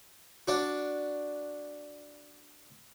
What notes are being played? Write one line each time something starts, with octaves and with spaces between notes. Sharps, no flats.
D4 F#4